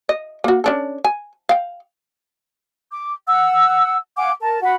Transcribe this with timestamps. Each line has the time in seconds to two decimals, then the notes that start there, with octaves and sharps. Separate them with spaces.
0.09 D#5
0.44 A#3 F#4
0.64 C#4 D4 A4
1.04 G#5
1.49 F5 G5
2.91 D6
3.27 F#5 E6
4.16 F5 F#5 G#5 D6
4.40 A#4 A5
4.62 F#4 F#5 B5